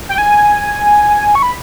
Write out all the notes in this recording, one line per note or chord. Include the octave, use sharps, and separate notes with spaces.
G5
G#5
C#6
B5